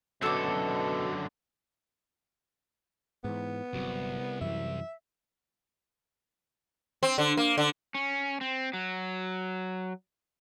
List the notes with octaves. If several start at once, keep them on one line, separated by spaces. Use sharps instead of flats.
F#2 B2 D3 F#4 A4 C#5 D6
G#2 E3 B3
G1 C2 F#3 C4
F#2 E3 E5
C4
D3
A#3
D3
C#4
C4
F#3